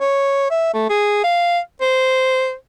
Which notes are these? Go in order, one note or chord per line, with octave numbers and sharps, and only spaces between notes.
C#5
E5
A3
G#4
F5
C5